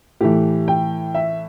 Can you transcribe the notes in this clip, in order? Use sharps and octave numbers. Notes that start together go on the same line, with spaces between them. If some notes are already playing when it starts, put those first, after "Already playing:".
A2 E3 G4
G5
E5